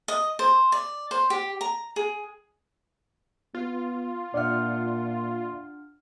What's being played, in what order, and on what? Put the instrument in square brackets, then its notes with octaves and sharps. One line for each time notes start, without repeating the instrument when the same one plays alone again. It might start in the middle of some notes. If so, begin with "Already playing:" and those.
[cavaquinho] D#5
C5
D5
C5
G4
A#5
G#4
[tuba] B3 [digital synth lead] F4
[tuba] A#2 [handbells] D4 F#5 F6 [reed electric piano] D5 E5